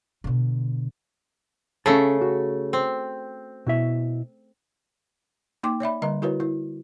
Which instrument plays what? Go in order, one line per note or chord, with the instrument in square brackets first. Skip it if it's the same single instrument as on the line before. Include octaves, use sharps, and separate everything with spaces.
[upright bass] B2 D3
[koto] C#3 A3 [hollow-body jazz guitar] C#4 A5
[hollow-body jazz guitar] F#4
[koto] C4
[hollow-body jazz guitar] B2 E4 E5
[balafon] A#3 D#4 G5 C6 D6
C#5 D5 E5 B5
D3 G3 A#4 D#5 A#5
E4 F#4 A#4 B4 C#5
E4